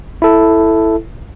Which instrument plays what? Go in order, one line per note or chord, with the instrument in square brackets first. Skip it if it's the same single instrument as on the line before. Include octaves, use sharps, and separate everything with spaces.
[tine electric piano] E4 A4